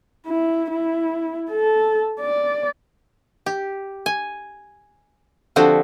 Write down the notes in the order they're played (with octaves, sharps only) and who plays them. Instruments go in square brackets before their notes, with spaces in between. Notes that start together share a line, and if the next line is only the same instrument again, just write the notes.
[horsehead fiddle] E4
E4
A4
D5
[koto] G4
G#5
D3 F3 C4 D4 F#4 G4